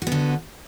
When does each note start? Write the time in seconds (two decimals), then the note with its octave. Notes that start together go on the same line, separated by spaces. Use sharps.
0.02 F#4
0.07 B3
0.12 D3